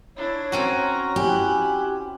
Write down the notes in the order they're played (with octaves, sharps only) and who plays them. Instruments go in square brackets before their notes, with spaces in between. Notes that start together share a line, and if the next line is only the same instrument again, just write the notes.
[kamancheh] D4 E4 [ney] C#5
[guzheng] C4 C#4 F#4 [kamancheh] A#5
[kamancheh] E4 F#6 [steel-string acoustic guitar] G4 [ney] G#5